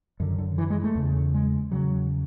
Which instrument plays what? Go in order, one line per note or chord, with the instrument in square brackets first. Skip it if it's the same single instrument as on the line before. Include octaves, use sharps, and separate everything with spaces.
[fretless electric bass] F#2 D3
D3
E3
G#3
A3
E2 C#3
G#3
E2 C#3 F#3